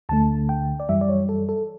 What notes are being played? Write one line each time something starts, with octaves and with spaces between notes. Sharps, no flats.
D2 D3 A3 A5
G5
D5
F#2 E3 G3 E5
D5
C#5
A4
A4